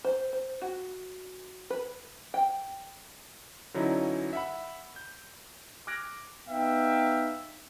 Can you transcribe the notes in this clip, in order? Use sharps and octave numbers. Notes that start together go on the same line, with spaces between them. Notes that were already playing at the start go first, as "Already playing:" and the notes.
C5
C5
F#4
B4
G5
D3 E3 F#3 C#4 D#4 E4
E5 F#5 B5
G6
D6 F6 F#6 G#6 A#6 D7
B3 D#4 E5 F5 G5